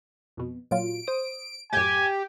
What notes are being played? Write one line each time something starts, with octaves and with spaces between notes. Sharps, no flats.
F2 B2
A#2 F#3 F4 D7
C5 D#6
F#2 A2 G4 G#5